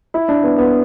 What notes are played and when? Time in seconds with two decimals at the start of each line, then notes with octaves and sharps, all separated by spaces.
0.14 E4
0.28 D4
0.44 B3
0.58 B3